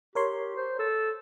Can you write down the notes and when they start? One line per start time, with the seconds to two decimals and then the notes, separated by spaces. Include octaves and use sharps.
0.15 G4 A#4 C#5 C6
0.56 C5
0.79 A4